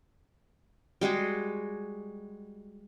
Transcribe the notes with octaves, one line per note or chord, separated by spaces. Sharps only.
G3 G#3 F#4 G#4